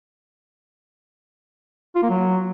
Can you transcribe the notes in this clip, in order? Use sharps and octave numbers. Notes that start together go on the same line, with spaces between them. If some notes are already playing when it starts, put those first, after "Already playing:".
F4
A#3
F#3